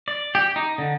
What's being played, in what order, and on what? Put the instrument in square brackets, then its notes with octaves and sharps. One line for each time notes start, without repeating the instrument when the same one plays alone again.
[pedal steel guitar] D5
G4
D#4
D3